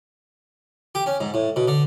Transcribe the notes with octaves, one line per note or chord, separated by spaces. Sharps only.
G4
C#4
G#2
A2
B2
D3